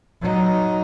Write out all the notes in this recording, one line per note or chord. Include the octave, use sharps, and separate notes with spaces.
F#3 D#4